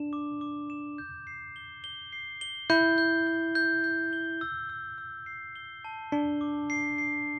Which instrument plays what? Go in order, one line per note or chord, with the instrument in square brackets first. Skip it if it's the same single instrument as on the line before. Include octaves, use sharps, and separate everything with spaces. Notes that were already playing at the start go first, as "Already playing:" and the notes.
Already playing: [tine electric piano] D4 [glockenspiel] E7
[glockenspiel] D6
D6
E7
G6
C7
G7
G7
C7
G7
[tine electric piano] E4 [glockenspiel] G6
[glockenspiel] G6
G6
G6
G6
G7
E6
E6
E6
C7
G7
A5
[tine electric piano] D4 [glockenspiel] G7
[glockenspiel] D6
C7
C7